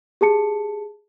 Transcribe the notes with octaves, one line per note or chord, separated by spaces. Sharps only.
G4 G#4 A5 C#7